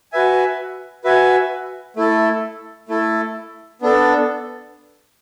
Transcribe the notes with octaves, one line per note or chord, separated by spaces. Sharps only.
F#4 B4 E5 G#5
F#4 B4 E5 G#5
A3 E4 A4
A3 E4 A4
B3 D4 A4